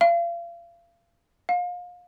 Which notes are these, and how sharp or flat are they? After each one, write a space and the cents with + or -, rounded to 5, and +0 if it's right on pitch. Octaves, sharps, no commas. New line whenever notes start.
F5 -35
F5 +30